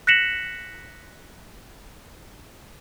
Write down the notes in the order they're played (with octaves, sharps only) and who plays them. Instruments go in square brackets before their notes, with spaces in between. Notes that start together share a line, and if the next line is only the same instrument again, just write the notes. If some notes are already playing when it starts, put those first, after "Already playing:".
[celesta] F#6 A#6 B6 C#7 E7 F#7